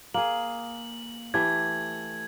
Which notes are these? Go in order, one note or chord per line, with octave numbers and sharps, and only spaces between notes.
A#3 G#4 F#7
E3 A3 G4 G#6